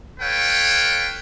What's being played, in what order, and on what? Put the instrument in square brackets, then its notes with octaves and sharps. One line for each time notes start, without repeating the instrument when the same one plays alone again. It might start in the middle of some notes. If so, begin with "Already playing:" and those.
[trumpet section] A4 B4 C#5 F5 G5